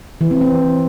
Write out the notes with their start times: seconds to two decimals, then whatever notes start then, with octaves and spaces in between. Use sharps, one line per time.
0.21 E3
0.31 C4
0.41 C4